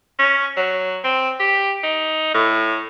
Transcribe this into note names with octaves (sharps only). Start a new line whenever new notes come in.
C#4
F#3
C4
G4
D#4
A2